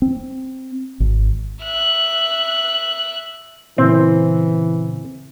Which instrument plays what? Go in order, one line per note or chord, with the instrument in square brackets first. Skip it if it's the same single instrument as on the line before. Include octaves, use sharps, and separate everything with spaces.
[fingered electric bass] C4
G#1
[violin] E5 F#6
[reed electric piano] A#2 C#3 E4 [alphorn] E3 [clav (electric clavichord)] C4